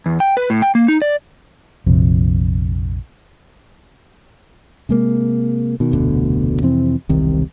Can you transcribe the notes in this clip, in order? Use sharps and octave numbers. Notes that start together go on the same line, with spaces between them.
E2
G5
B4
A2
G5
A#3
D#4
D5
A#1 F2 C3
C3 G#3 A#3
B2 D#3
F1 D2 B2 D3
F2 C3 E3 C4
E1 C2 C3 D#3